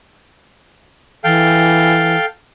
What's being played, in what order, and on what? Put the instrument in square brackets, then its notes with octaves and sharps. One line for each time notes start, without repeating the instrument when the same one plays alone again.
[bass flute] E3 [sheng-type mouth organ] A4 F5 G5